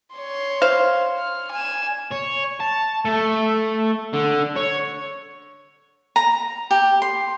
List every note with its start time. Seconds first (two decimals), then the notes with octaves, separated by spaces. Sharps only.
0.16 C#5 C6
0.62 C5 F5
1.19 F6
1.52 G#5 E7
2.11 C#5
2.60 A5
3.05 A3
4.13 D3
4.56 C#5
6.16 A#5
6.71 G4
7.02 C6